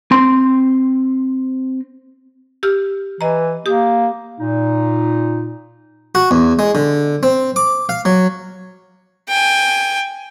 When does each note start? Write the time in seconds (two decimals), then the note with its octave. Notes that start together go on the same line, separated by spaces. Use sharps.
0.11 C4 C6
2.63 G4 E6 F6
3.21 E3 D#5 A#5
3.66 A#3 G4 D#6
4.39 A#2 D#4
6.15 F#4
6.31 E2
6.59 G#3
6.75 D3
7.23 C4
7.56 D6
7.89 F5
8.05 F#3
9.28 G5 G#5